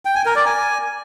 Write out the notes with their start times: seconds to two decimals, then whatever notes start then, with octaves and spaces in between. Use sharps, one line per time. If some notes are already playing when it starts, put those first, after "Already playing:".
0.05 G5
0.15 G#5
0.25 A#4
0.36 D5
0.46 G#5